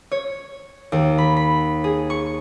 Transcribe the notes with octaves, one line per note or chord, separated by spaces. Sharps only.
C#5
D#2
B5
B5
G#4
C#6